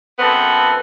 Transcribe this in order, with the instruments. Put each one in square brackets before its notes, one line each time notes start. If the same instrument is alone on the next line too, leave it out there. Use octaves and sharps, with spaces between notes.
[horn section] F#2 B3 C4 A4 B4